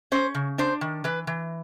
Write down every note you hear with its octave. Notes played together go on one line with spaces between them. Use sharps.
C#4 C5
C#3
D4 C5
D#3
E3 B4
E3